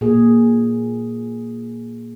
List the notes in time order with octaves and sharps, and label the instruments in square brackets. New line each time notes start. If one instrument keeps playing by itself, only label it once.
[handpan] A#2 G#4